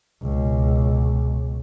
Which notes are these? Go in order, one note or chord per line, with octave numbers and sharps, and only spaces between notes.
C#2 B2